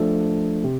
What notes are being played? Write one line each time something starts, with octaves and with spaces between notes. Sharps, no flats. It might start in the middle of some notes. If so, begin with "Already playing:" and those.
Already playing: F3 A3 D4 A4
C3